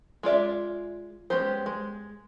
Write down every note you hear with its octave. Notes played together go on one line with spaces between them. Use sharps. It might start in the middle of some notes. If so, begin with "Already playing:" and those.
G#3 F4 D5 E5
G#3 B3 C#4 G4 C5
G#3